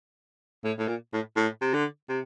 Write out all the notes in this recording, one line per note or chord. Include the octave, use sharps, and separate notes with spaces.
A2
A2
A#2
A2
A2
C3
D3
C3